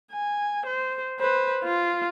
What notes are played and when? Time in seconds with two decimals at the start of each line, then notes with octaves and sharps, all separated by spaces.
0.11 G#5
0.66 C5
1.19 B4 C5
1.64 F4